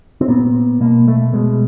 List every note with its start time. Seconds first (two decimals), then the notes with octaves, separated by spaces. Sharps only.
0.21 C4
0.28 A#2 B3
0.81 B2 A#3
1.08 A3
1.34 B2 G#3